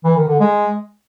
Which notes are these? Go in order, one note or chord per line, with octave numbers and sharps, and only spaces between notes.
E3
D#3
D3
G#3